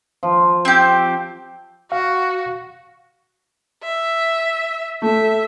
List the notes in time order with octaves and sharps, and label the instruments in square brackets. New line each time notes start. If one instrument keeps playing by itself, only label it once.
[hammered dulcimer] F3
[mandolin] C4 G4
[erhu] F#4 [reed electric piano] F5
[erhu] E5
[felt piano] A3 [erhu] E5